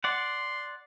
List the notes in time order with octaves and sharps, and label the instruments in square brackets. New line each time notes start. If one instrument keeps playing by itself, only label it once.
[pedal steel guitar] D5 F#5 [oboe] C6